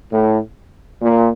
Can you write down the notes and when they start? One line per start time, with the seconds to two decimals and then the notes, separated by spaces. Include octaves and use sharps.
0.12 A2
1.02 A#2